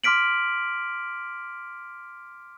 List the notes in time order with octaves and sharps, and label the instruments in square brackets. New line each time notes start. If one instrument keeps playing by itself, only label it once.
[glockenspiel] C6 D6 F6 B6 D7 F#7